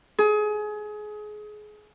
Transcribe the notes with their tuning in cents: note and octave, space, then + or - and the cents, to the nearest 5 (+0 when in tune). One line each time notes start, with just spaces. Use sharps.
G#4 +25